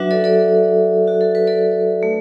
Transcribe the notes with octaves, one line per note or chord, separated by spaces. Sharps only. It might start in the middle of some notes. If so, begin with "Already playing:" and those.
Already playing: F#3 D4 F#4 B4 E5
A4 D5
A4 D5
F#4
A4
B4
A4 D5
A3